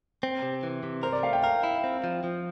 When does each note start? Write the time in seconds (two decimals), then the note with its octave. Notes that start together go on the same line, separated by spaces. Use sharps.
0.23 C4
0.43 C3
0.63 E3
0.83 C3
1.03 A#4 C5
1.13 D5
1.23 A3 F5
1.33 G5
1.43 A#4 F5
1.63 E4
1.84 C4
2.04 F3
2.24 F3